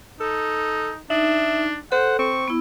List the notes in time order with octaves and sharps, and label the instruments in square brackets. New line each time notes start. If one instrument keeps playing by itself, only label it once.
[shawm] D#4 [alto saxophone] A4
[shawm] D4 [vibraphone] D#4 [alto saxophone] E5
[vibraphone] A4 [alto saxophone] C5 [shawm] F#5
[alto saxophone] C4 [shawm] C#6
[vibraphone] B3 E4